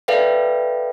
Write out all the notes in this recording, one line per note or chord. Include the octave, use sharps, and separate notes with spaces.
A4 B4 D5 E5 F5 G5